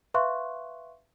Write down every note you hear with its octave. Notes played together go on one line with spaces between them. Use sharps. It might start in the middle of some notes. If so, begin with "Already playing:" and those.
B4 E5 F5 C6 C#6 F#6